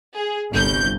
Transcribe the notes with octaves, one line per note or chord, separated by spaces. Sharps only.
G#4
G1 C2 G6